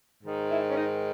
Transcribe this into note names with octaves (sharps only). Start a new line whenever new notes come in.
G#2
D#3
E4
C#4
D#4